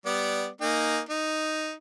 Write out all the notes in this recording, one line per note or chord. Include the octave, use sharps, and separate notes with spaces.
G3 B3 D5
A#3 D#4 G#5
D#4